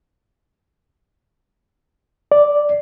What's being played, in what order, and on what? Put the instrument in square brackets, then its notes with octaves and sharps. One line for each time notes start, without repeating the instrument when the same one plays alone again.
[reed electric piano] D5